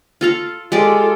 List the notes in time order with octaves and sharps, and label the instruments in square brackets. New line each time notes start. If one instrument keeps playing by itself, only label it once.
[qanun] F4 A4 F5
[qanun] G#3 G4 D5 [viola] F4 A4